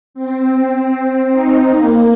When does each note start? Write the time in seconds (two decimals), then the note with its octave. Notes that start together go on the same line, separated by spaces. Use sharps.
0.14 C4
1.32 D#4
1.70 A#3